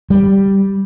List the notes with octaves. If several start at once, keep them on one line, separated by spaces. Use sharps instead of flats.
G3